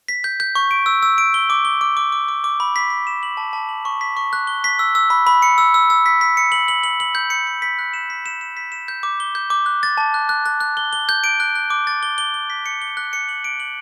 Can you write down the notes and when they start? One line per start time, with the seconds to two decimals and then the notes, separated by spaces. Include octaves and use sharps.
0.08 B6
0.24 G6
0.40 G6
0.55 C#6
0.71 D7
0.86 E6
1.03 E6
1.18 D7
1.34 G7
1.50 D6
1.65 G7
1.81 D6
1.97 D6
2.12 D6
2.28 D6
2.44 D6
2.60 B5
2.76 B6
2.90 B6
3.07 E7
3.23 F#7
3.37 A5
3.53 A5
3.69 F#7
3.85 C#6
4.01 B6
4.17 C#6
4.33 F#6
4.47 G7
4.64 B6
4.79 E6
4.95 E6
5.10 B5
5.27 B5
5.42 C#7
5.58 E6
5.74 E6
5.90 E6
6.06 B6
6.21 B6
6.37 C#7
6.52 F#7
6.68 F#7
6.84 F#7
7.00 F#7
7.15 G6
7.30 C#7
7.47 C#7
7.62 B6
7.79 F#6
7.94 E7
8.10 B6
8.26 E7
8.41 E7
8.57 B6
8.72 E7
8.88 G6
9.03 D6
9.20 G7
9.35 G6
9.50 D6
9.66 F#6
9.83 A6
9.97 A5
10.14 F#6
10.29 F#6
10.46 F#6
10.60 F#6
10.77 G7
10.93 G7
11.09 G6
11.24 D7
11.40 F#6
11.55 F#6
11.70 D6
11.87 A6
12.03 G7
12.18 G7
12.34 G7
12.50 B6
12.66 C#7
12.82 G7
12.97 F#6
13.13 C#7
13.29 F#7
13.44 D7
13.60 F#7